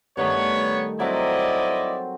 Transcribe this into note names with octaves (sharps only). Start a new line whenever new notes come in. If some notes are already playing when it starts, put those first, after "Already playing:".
G2 D#3 A3 B3 C#5
F#3 C4 E4 D5 D#5